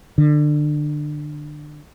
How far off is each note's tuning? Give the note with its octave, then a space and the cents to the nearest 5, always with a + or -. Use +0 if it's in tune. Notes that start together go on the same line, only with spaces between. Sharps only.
D3 +25